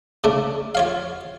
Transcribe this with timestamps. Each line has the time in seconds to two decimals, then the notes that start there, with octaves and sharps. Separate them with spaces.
0.24 C#3 A3 D4
0.75 F4 C#5 F5